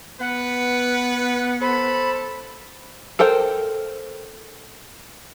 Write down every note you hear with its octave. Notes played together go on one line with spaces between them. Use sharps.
B3 B4 F#5
A4 C5 B5
A4 A#4 C5 G5